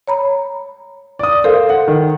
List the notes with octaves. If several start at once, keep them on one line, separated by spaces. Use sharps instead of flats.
C#5 A#5 B5
D5 D#6
A4 A#4 C5 F5
F#5
D#3